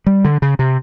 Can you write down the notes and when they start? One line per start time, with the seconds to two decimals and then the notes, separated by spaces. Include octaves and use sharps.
0.06 G3
0.25 D3
0.42 C#3
0.59 C3